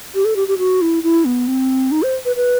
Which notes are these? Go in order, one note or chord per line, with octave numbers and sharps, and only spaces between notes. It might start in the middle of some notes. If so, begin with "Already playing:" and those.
G4
A4
G4
G4
F#4
E4
E4
B3
C4
D#4
C5
B4
B4